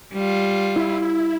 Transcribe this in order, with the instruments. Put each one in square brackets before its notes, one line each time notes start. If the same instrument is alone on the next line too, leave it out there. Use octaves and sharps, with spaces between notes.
[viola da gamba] G3 F4
[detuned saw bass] E4